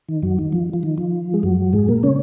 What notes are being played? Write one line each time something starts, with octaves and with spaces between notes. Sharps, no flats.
D#3
F#2 F#3
D#3
F3
F3
D#3
F3
G#3
F#2 F#3
G#2 G#3
A#2 A#3
C#3 C#4